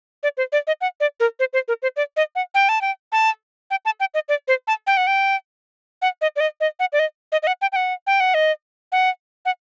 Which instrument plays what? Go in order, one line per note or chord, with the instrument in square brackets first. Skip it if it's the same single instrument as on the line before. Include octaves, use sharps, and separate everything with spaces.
[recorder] D5
C5
D5
D#5
F#5
D5
A#4
C5
C5
A#4
C5
D5
D#5
F#5
G5
A5
G5
A5
G5
A5
G5
D#5
D5
C5
A5
G5
F#5
G5
F#5
D#5
D5
D#5
D#5
F#5
D5
D#5
D#5
D#5
F#5
G5
G5
F#5
G5
F#5
D#5
F#5
F#5